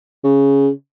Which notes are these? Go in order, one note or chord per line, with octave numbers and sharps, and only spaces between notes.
C#3